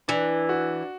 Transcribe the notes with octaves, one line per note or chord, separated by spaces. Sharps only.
E3 D4
F#4